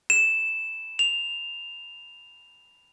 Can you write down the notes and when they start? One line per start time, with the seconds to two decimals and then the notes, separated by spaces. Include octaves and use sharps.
0.10 E7
0.99 F7